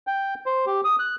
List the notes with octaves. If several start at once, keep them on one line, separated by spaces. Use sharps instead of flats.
G5
C5
G4
D#6
F#6